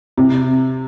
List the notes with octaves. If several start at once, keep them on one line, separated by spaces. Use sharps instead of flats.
C3